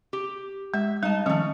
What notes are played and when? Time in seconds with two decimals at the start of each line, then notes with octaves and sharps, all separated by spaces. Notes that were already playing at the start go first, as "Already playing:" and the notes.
0.13 G4
0.74 G#3 E5
1.03 G3 D#4 D#5 A5
1.26 D#3 F3 A3 C#4